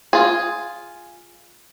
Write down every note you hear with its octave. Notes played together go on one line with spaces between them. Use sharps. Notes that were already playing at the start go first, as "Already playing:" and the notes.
F4 G#4